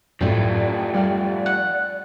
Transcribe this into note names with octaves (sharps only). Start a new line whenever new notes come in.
F#2 A2 F3 A3 E4 D5 G5
G3 D5 F5
F#5